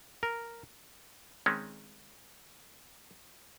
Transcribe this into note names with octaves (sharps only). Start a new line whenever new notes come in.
A#4
D#3 G#3 C4 C#4